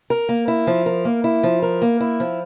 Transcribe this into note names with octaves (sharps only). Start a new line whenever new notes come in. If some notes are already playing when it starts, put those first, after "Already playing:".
A#4
A#3
E4
F3
A#4
A#3
E4
F3
A#4
A#3
E4
F3